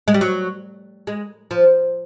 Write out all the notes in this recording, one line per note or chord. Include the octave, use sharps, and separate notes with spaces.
G#3
G3
F#3
G#3
F3